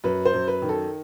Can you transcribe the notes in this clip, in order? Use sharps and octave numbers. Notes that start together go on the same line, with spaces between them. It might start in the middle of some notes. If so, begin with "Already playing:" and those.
F#2 B4
C5
F#2
B4
D#3
A4